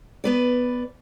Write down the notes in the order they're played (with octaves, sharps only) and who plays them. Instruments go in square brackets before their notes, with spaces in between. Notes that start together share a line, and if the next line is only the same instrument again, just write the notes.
[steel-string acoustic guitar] B3 B4 D5